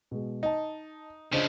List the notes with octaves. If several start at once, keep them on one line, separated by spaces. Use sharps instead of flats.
B2 G#3
D#4 D#5 A5
C#3 F3 D4 C5 D#5